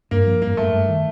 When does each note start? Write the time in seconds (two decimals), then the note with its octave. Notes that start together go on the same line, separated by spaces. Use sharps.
0.11 G2 A#3
0.27 F3
0.42 G2 A#3
0.57 G2 A3
0.73 G2
0.89 D#3